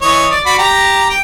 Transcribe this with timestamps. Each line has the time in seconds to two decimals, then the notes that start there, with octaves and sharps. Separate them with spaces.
0.02 E3 C#5 D#5
0.31 D5
0.46 F#4 D5 B5
0.59 G4 A#5
1.10 G5